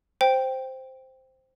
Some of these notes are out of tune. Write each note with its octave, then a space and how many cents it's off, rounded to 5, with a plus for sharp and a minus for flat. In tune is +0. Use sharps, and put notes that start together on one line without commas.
C5 +0 G5 +0